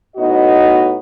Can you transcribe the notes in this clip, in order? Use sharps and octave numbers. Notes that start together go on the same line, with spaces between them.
A2 B3 D#4 F#4 D#5